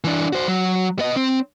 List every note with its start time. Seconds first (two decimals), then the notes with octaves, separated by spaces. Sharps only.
0.04 E3 D4
0.33 F#4 C5
0.48 F#3
0.99 B3 D#5
1.16 C4